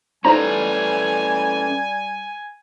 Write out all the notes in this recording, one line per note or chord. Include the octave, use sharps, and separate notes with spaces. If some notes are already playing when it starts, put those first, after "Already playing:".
G3 C#4 D#4 A4 B4 C5 G#5 A#5